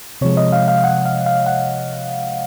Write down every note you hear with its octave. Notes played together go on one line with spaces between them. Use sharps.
C3 F3 G#3 C#5
D#5
F5
F5
F#5
F5
F5
F#5